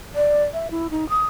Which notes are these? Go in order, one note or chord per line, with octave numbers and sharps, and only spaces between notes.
D5
E5
E4
D#4
D#6